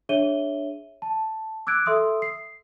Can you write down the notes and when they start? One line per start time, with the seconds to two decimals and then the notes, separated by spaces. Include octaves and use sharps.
0.09 D4 G#4 C#5 E5 D#7 G7
1.02 A5
1.67 D6 E6 F#6 G#6 D7
1.85 A4 E5 C6 D#6 E6
2.22 C7